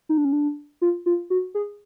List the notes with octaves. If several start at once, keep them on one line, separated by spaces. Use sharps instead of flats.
D#4
D4
C#4
D4
F4
F4
F#4
G#4